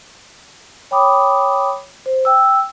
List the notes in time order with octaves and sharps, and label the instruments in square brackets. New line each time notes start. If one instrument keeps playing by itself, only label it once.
[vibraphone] C#5 G5 B5 D6 D#6
C5
G5 E6